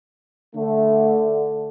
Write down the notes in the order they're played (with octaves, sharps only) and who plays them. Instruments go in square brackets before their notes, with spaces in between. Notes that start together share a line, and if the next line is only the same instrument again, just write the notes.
[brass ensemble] D3 A3